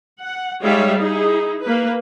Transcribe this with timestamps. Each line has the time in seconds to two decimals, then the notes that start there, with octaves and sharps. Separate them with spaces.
0.21 F#5
0.62 G3 G#3 D#4 C#5 E5 F5
0.99 D#4 E4 G#4
1.63 A#3 B4